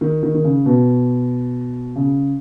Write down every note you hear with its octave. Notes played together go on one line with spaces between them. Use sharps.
D#3
D#3
D#3
C#3
B2
C#3